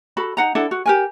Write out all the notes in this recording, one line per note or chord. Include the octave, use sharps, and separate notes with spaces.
F#4 A4 B5
D#4 F#5 A#5
D4 E4 A4 F#5
F#4
G4 A#4 G#5